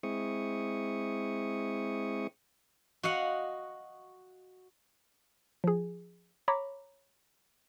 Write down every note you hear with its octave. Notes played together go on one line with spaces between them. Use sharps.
G#3 C4 E4 C#6 D#6
F#4 D#5 F5 F#5
F3 G#4
C#5 A#5 B5 D6